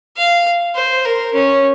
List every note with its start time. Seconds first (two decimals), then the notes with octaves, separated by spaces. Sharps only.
0.17 F5
0.75 C5
1.05 A#4
1.33 C#4